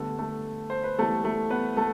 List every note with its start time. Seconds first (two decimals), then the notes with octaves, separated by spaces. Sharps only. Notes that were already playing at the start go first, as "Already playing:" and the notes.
Already playing: D3 G3 A3 B3 A4
0.18 A3 A4
0.70 C5
0.84 B4
0.98 E3 G3 A3 B3 A4
1.24 A3 A4
1.50 B3 B4
1.77 A3 A4